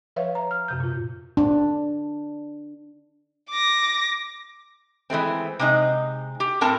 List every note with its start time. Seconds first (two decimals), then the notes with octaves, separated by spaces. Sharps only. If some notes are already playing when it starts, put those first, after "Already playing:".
0.16 F3 B4 C#5 E5 F5
0.35 A#5
0.51 F6
0.68 F#2 C3 G6
0.80 A#2 F4
1.37 D4
3.50 D6 A#6
5.10 E3 G#3 A3 C4
5.59 C3 G#3 D#4
6.40 G4
6.61 A2 C4 A#4 A5